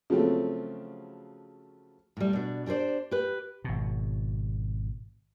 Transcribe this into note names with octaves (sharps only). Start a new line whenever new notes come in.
C#3 F3 F#3 A3 C4
A2 G3
B2 D4
D4 G4 G#4 C5 D5
G4 B4
G#1 B2